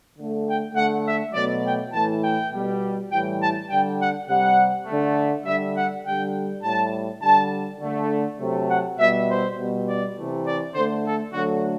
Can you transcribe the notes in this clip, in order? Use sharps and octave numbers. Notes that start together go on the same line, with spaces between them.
D3 A3
G5
D3 A3 F#5
E5
B2 F#3 A3 D5
G5
A2 E3 A3 A5
G5
B2 G3
A2 E3 G3 G5
A5
D3 G3 G5
F#5
C3 G3 F#5
D3 A3
D3 G3 E5
F#5
D3 G3 G5
A2 G3 A5
D3 G3 A5
D3 A3
C3 F#3 A3
F#5
B2 G3 E5
C5
B2 G3
D5
C3 E3 A3
D5
D3 C5
A3
A4
D3 F#3 A3 F#4